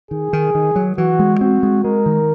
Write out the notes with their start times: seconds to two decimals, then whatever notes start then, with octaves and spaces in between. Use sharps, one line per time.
0.11 D#3 G#4
0.33 D#3
0.55 D#3
0.76 F#3
0.98 E3 F#4
1.19 G#3
1.41 C4 F#4
1.63 G#3
1.84 G#3 A#4
2.06 D#3